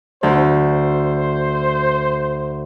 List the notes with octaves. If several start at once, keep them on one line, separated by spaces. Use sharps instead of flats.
D2 C5